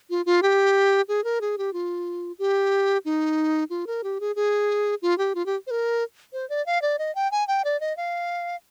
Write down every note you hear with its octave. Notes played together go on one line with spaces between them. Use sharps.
F4
F4
G4
G#4
A#4
G#4
G4
F4
G4
D#4
F4
A#4
G4
G#4
G#4
F4
G4
F4
G4
C5
A#4
C5
D5
F5
D5
D#5
G5
G#5
G5
D5
D#5
F5